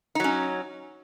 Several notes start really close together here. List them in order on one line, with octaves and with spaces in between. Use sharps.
D#4 F#3 C#4